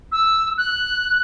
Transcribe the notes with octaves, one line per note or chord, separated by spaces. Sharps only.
E6
F#6